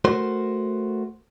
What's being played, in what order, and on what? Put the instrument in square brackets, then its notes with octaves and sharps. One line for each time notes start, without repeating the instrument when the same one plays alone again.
[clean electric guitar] A3 F#4 A#4 C5